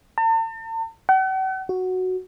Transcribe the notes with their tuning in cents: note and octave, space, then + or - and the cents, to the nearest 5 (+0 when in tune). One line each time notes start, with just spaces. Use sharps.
A5 +45
F#5 +45
F#4 +0